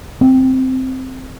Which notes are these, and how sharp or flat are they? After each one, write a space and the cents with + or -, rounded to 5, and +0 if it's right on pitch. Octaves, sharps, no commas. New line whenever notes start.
C4 -5